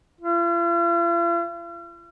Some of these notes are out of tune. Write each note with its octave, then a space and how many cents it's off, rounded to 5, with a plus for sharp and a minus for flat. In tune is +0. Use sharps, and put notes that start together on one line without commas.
F4 -45